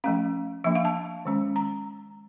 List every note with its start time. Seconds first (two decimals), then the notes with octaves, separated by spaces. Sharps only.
0.04 F3 A3 C#4 F5
0.64 F3 A#3 D4 E5
0.75 F5
0.85 A5
1.25 D#3 G#3 C#4
1.56 A#5